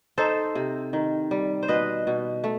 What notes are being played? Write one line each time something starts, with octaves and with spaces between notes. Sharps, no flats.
D#4 A4 C5
C3
D#3
G3
C5
B2 B4 D#5
B2
A3